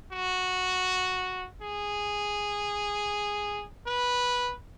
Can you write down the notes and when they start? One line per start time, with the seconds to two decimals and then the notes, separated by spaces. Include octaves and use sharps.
0.12 F#4
1.61 G#4
3.86 B4